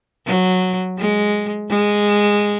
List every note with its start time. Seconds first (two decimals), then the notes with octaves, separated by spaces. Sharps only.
0.27 F#3
0.98 G#3
1.70 G#3